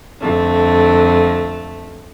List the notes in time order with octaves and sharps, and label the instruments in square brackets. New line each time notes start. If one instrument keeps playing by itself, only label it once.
[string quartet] F2 D3 A3